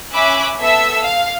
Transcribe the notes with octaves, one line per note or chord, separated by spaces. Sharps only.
C#4 E5 G#5 B5 D6 F#6
B3 A4 E5 E6
F5